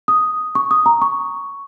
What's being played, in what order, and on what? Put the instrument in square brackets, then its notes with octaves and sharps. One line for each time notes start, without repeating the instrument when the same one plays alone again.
[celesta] D#6
C#6
D#6
A#5
C#6